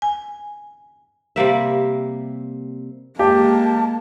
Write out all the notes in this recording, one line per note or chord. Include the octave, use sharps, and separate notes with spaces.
G#5
C3 G3 A#3 E5
G#3 A#3 G4 A5